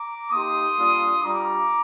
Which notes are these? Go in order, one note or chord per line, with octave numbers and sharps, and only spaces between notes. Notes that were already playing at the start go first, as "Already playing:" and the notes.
Already playing: A#5 D6
A#3 D#4 G4 C6 D#6
G3 A#3 D4 F4
G3 D4 F4 A#5 D6